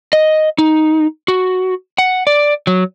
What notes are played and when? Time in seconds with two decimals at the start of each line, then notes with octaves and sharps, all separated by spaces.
0.13 D#5
0.58 D#4
1.28 F#4
1.98 F#5
2.27 D5
2.67 F#3